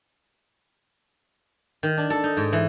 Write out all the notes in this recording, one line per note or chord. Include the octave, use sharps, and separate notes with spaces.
D#3
D4
A4
D#4
G#2
E3